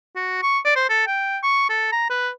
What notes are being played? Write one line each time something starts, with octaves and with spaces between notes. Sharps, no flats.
F#4
C#6
D5
C5
A4
G5
C#6
A4
A#5
B4